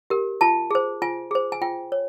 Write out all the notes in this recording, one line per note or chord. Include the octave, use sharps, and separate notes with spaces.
G4 A#4
F4 A5
G#4 C5
F4 G#5
G#4 C5
G#5
F4 G5
C#5